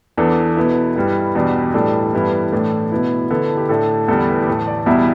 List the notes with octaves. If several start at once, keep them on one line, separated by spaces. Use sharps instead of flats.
E2 E3 B3 D4 A4
B2 B3 E4
G2 G3 E4 B4
E2 B2 G3 D4
A2 E3 G3 D4 A4
G2 E3 G3 B3 E4
A2 E3 A3 D4
B2 B3 E4
D3 B3 E4 A4
G4
A2 A3 D4 A4
E2 D3 G3 E4 A4
D5
B4
G4
A2 E3 A3 A4
D5
E2 B2 G3 E4 E5